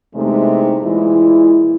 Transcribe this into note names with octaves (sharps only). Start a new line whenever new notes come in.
E2 C3 G#3 A3 D#4
A#2 E3 G#3 E4